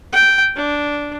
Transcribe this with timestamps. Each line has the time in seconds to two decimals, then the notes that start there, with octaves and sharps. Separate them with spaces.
0.13 G5
0.56 D4